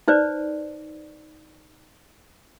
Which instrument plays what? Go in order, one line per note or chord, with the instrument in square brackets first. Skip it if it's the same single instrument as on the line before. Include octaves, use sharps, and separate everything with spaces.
[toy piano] D#4 B4 C5 D5